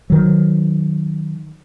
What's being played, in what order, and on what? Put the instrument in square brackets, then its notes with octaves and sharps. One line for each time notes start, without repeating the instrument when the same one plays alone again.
[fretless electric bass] D#3 F#3